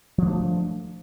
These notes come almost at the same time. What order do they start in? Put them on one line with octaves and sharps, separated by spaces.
F3 D4 A3